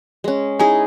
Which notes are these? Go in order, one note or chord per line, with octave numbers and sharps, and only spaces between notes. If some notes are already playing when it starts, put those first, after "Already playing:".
G#3 C#4
D#4 E4 G#4 G#5